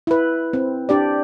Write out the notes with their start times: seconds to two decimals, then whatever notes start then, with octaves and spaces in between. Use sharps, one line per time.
0.07 E4 B4
0.53 C4
0.89 D4 G4 D5